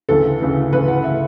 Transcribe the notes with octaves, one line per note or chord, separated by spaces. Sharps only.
D2 C#3 E3 A4
D2 C#3 E3
D2 C#3 E3 B4
F#5
C#3 E3 E5